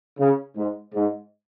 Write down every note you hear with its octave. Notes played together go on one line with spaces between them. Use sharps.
C#3
G#2
G#2